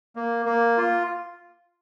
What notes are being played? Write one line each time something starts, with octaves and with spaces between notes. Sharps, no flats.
A#3
A#3
F4